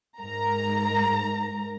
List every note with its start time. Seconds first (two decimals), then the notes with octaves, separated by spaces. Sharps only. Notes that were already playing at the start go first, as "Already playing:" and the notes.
0.21 G#2 A#4 A#5